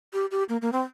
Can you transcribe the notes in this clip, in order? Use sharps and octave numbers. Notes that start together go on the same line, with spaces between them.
G4
G4
A#3
A#3
C4